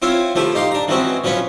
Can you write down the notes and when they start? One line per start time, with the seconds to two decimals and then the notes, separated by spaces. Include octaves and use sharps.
0.02 C4 E4 F4 C#5
0.35 F3 A3 E4 G4
0.55 D#4 G4 F5 C6
0.71 D4 A#5
0.88 E3 G#3 C4 C#4 F#4
1.24 F3 F#3 C#4 B4 C#5